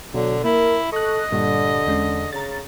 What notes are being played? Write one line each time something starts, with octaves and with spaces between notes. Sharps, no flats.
B2 D3 F#3
A#3 E4 A#4
A4 D#5 C#6 F#6
G2 A#2 D3 G3
E2 G#3 C#4
C#3 A#5 A6